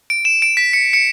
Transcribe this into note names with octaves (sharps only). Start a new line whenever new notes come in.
D7
E7
D7
B6
C#7
C#7